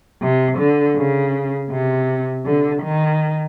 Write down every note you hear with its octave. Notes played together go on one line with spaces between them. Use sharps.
C3
D3
C#3
C3
D3
D#3